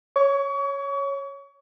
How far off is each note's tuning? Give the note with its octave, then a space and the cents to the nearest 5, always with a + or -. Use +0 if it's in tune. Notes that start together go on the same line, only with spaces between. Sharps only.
C#5 +0 C#6 +35